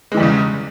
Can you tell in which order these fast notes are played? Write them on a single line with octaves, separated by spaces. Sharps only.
G#3 E3 G3 E2 C#3